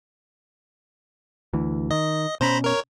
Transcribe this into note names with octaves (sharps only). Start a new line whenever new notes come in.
D2 E3
D#3 D#5
B2 C#4 C5 A#5 B5
A#4 C#5